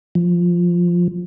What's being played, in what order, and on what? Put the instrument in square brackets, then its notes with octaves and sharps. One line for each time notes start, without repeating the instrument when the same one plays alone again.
[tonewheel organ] F3